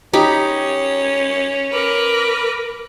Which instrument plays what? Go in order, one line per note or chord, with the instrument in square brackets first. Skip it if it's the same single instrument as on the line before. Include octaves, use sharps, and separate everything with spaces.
[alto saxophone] C#4 [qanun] D#4 G4 B5
[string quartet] A#4 B4 D6